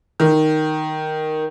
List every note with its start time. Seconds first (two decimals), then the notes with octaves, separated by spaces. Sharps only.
0.20 D#3